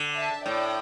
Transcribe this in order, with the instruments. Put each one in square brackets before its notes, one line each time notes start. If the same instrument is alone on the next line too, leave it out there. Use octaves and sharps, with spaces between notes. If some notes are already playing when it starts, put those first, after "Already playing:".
Already playing: [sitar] D3
[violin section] E5 A5
[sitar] A2 [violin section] D5 G5